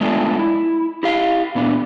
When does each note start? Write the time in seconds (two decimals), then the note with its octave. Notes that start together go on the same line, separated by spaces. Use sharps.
0.01 G#3 A3 B3 D4 F4
0.39 E4
1.03 E4 G4 F5
1.55 A#2 B3 D4